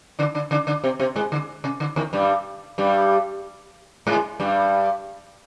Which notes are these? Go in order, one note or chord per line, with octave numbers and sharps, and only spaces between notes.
D3 D4
D3 D4
D3 D4
D3 D4
C3 C4
C3 C4
G#2 G#3
D3
C3
D3
D#2 D#3
G2 G3
G2 G3
G#2 G#3
G2 G3